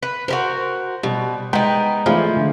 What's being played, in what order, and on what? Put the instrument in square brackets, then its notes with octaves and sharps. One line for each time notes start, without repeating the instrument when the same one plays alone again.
[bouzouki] B4
[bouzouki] F#4 G4 A#4 [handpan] C5
[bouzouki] B2 [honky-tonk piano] G3
[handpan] G#3 [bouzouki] B3 D#4 [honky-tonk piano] G5 [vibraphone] A#5
[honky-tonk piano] E3 G#4 [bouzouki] F3 [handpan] A3 D5 [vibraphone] F4 B5
[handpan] D3